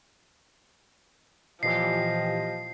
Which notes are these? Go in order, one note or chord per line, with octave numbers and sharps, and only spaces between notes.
A#2 E3 F3 G4 D#5 C7